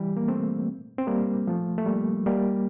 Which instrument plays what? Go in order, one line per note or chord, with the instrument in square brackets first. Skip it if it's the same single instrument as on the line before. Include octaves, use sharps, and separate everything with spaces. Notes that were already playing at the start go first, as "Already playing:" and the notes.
Already playing: [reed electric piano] E3 G3
A#3
A3 C4
C4
G3 A#3
F3 A3
A3
G3 A#3
G3 A#3